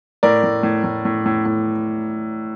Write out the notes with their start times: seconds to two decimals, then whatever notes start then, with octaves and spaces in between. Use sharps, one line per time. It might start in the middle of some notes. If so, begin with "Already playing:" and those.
0.23 A2 A#4 D5
0.43 A2
0.63 A2
0.84 A2
1.05 A2
1.26 A2
1.46 A2